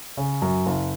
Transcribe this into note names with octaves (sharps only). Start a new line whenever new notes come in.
C#3
F#2
F#1